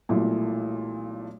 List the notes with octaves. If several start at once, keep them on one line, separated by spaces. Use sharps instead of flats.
B1 A#2 E3 G3 A3